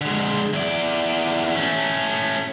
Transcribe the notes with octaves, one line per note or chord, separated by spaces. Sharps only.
D3 G#3
E2 D5
A3 C#4